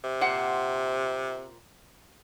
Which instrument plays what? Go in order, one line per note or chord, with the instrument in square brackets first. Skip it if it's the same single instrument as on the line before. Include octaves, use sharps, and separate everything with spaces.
[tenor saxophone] C3
[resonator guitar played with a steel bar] A#2 C5 F#5